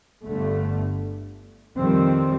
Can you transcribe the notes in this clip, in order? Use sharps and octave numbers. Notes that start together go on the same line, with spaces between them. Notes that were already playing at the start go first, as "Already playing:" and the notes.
G1 G2 D3 A3
F2 D#3 G3 C4